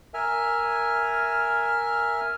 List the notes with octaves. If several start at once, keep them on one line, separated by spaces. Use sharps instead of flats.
A#4 E5 G#5 F6